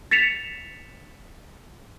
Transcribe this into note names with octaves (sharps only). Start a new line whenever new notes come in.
A6 B6 C#7 E7 F7